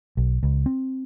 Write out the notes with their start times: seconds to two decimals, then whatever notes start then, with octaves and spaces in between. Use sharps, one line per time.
0.17 B1
0.43 C#2
0.66 C4